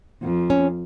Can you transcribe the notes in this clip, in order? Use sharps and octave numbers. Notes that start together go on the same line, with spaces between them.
F2
C#4